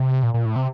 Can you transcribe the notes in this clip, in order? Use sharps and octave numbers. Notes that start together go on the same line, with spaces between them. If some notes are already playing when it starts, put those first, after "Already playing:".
Already playing: C3
A#2
A#2
A2
C3